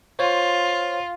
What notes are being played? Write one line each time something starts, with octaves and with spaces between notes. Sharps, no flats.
F4 C5 C#5